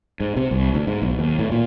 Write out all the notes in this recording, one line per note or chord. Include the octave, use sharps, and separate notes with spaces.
G#2
C3
C2
D2
G#2
B1
D#2
A2
A#2